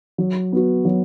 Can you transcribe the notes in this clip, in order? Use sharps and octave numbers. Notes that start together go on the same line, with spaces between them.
F#3
B3 F#4
F#3